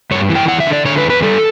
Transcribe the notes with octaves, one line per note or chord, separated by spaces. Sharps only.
G2 C#5
E3
G5
E2 F#5
E5
D3
D5
D3 C#5
B4
E2
B4
G3 A4